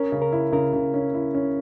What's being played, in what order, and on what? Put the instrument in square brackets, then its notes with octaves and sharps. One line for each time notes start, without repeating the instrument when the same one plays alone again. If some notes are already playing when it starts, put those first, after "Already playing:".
Already playing: [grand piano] C#4 [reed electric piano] A#4
[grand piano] C#3
[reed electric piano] A#4
[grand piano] E4
[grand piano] C#3 [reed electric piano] A#4
[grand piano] C#3
C#4
E4
C#4